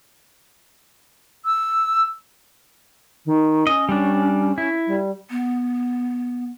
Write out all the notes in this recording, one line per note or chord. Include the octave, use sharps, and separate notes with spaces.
E6
D#3
C#4 D#5
G3 D4
E4
G3
B3